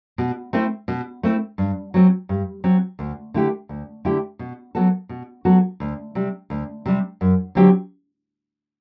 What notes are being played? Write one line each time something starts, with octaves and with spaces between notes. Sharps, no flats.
B2
A3 C4 E4
B2
A3 C4 E4
G2
F#3 C4
G2
F#3 C4
D2
D3 A3 E4 G4
D2
D3 A3 E4 G4
B2
F#3 B3 F#4 A4
B2
F#3 B3 F#4 A4
D2
C3 G3
D2
C3 G3
F#2
D3 F#3 C4 G4